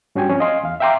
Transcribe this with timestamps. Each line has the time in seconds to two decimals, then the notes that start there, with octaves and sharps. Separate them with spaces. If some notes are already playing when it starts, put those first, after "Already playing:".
0.15 G2 C#4 F#4 G5 G#5
0.29 F3 C4 C#4
0.40 D#5 F5 G#5 C6
0.63 E2 F5
0.80 E5 F5 G5 A#5 C6 D6